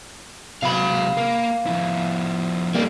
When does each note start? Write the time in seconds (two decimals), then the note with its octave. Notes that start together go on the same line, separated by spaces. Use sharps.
0.63 C3 F#3 F5 B5
1.17 A#3
1.67 F2 E4
2.75 G3 A#3